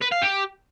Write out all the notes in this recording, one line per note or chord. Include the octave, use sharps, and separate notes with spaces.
B4
F5
G4